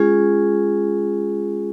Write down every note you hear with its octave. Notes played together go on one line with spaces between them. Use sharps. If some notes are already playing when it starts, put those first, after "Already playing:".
Already playing: G#3 C#4 F4 G#4